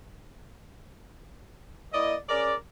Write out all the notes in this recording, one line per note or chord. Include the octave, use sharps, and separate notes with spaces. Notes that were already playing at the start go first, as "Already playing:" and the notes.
A#3 E4 D5 D#5
C#4 G#4 A#4 D5